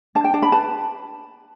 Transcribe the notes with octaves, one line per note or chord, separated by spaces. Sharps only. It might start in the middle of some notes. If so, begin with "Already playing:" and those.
D4 A5
G5
D4 A5
B5
B4 A5